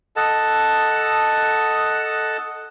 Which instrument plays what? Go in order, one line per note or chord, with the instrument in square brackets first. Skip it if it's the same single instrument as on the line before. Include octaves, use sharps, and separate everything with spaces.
[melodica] A4 D#5 F#5 A5